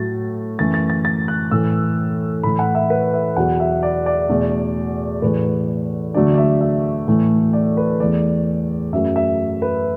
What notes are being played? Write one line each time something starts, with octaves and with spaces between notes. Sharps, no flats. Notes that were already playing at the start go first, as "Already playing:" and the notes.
Already playing: A2 F#3 A3 A6
F#2 E3 A3 A6
A6
A6
A6
F#6
A2 E3 A3 E6
A2 E3 A3 B5
F#5
E5
B4
E5
E2 B2 F#3 F#5
E5
D5
D5
E2 B2 A3
A2 E3 A3 B4
D2 D3 F#3 A3 D5
D5
E5
E5
A2 E3 A3
D5
B4
E2 E3 A3 D5
F#2 F#3 A3 E5
E5
B4